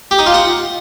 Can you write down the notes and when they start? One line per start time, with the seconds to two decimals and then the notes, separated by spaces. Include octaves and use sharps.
0.11 G4
0.19 D#4
0.26 F4
0.34 F#5